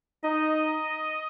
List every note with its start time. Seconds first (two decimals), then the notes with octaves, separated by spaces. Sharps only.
0.23 D#4 D#5